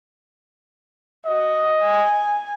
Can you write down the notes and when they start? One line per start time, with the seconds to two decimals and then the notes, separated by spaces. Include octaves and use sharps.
1.26 F#4 D#5
1.82 G#5